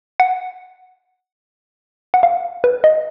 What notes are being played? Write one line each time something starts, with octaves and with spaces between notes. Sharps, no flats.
F#5
F#5
F5
B4
D#5